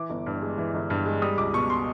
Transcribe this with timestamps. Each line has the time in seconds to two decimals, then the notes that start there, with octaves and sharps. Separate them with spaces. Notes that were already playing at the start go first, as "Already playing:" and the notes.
Already playing: E3 D6
0.10 G1
0.26 G2
0.42 G#3
0.58 E3
0.74 G1
0.90 G2
1.06 G#3
1.22 G3 D#6
1.38 C#2 D6
1.53 B2 C#6
1.70 C6